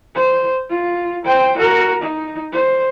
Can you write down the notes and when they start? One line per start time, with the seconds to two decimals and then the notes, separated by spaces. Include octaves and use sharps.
0.15 C5
0.70 F4
1.26 C5 G5
1.58 F#4 A#4
2.02 D#4
2.53 C5